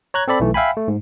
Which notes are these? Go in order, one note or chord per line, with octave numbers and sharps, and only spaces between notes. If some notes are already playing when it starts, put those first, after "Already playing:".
C#5 A#5 F#6 G#6
C4 A4 D5 B5
B1 E3 A3
E5 F5 G5 G#5 B5
A3
G#2